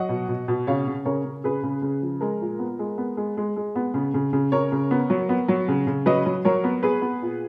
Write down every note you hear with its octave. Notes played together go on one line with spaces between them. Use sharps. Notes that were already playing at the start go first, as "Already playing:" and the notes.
Already playing: F#3 D#5 F#5
B2
B2
B2
C#3 C#5 F5
C#3
C#3 A#4 C#5
C#3
C#3 G#4 B4
C#3
C#3
F3
G#3 A#4
A#2
B3
G#3
B3
G#3
G#3
G#3
B3
C#3
C#3
C#3
C#3 A#4 C#5
C#3
B3
F#3
B3
F#3
C#3
C#3
F#3 B4 D#5
F#3
F#3 A#4 C#5
B3
B3 G#4 B4
B3
A#2